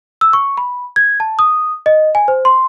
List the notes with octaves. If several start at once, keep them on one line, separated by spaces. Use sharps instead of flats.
E6
C#6
B5
G#6
A5
D#6
D#5
G#5
C5
C6